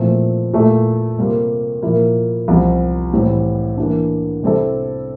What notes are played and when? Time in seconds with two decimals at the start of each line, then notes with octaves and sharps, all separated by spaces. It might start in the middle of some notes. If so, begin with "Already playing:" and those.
Already playing: A#2 F3 A3 C4 E4
0.53 A#2 A3 E4 A4
1.18 C3 G3 A#3 F4
1.82 A#2 F3 A#3 E4 A#4
2.48 C2 C3 F3
3.12 A2 E3 G3 C4 G4
3.77 E3 A#3 D4
4.43 C3 G3 C4 E4 A4